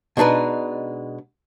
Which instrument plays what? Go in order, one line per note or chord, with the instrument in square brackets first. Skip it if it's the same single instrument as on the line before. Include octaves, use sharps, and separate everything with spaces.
[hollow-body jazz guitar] B2 G#3 D4 D#4 B4